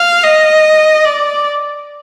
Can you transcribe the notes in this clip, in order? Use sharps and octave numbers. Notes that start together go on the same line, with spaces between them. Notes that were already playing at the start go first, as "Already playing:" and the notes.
Already playing: F5
D#5
D5